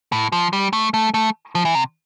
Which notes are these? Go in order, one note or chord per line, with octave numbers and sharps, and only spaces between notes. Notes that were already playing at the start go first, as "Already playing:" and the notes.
A2
F3
G3
A3
A3
A3
F3
E3
C3